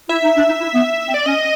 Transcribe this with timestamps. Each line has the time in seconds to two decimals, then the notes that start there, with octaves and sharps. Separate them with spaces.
0.09 E4 E5
0.22 D#4
0.36 D4
0.48 D#4
0.61 E4
0.74 B3
1.07 C4
1.14 D5
1.26 C#4 D#5